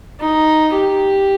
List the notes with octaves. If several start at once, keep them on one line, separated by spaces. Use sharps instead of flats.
D#4
G4